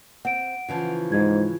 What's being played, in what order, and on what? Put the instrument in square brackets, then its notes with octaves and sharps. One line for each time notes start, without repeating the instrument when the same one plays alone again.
[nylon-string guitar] C4 [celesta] F#5 D7
[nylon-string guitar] C#3 E3 F3
[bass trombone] G#2 [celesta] G#6